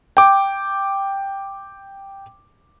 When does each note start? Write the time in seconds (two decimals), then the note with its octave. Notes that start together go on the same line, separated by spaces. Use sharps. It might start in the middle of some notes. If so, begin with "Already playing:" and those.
0.17 G5 D6